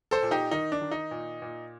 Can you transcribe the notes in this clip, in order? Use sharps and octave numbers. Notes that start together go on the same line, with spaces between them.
A4 C5
A#2
D#4 G4
D#3 D#4
D4
D#3
D#4
A#2
A#2